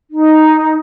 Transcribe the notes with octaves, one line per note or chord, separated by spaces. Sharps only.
D#4